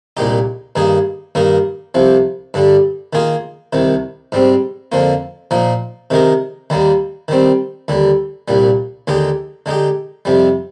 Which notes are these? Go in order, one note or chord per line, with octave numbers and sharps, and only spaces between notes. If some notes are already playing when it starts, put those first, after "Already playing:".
C2 A#2 G#3 D#4 G4
G2 D#3 A#3 D#4 G#4
G2 D#3 A#3 D#4 A#4
C2 C3 F3
G2 D3 G3
D#3 A#3 F4 G#4
C2 C3 D#3
G#2 G3 C4
F2 D3 F3 A#3 F4
A#2 F3 A#3 D#4
C3 D#3 G#3 D#4 A#4
D#2 D#3 G3 A#3
D#3 G3 C4
D#2 D3 G3
C2 A#2 G3
D#2 D3 G#3 D#4 G4
D3 G#3 D#4 G4
F2 C3 G3